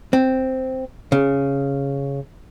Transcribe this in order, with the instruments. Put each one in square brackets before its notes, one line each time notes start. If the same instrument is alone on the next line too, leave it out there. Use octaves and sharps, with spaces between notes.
[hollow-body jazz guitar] C4
C#3